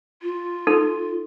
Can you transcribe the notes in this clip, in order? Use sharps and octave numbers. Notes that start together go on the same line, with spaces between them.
F4
D#4 A4